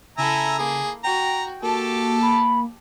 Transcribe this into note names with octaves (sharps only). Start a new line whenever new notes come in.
C#3 E4 A4 E5 G#5 A#5
A#3 G#4
F#4 G5 A#5
A#3 F#4 G4 A4 A5
B5